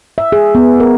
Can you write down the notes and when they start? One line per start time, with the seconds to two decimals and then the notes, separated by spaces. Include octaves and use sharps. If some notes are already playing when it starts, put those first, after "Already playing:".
0.18 E5
0.32 G#4
0.55 B3
0.80 A#4